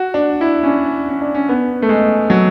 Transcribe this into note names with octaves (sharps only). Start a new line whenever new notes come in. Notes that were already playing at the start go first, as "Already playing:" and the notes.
Already playing: F#4
D4
E4
C#4
D4
C#4
D4
C#4
B3
A3
G#3
F#3